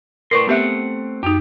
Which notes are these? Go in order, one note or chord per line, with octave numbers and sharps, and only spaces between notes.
A2 A#4 B4 D5 C6 C#6
A3 B3 C4 G4 E5 F#5
F#2 D#4 G4